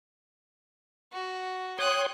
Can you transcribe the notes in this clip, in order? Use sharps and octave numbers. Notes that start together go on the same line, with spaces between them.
F#4
C#5 G5 C6 D#6 F#6